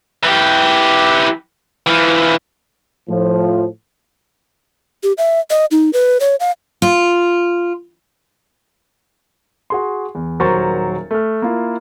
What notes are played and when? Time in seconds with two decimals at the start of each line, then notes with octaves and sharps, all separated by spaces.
0.23 E3 G4
1.87 E3 F3
3.09 A2 F3
5.03 G4
5.18 E5
5.50 D#5
5.71 D#4
5.93 B4
6.20 C#5
6.40 F5
6.82 F4
9.70 F#4 G#4 C6
10.15 E2
10.40 D#1 F#3 A#4 C5 C#6 A6
11.11 A3 F6
11.42 A#3 E4 F4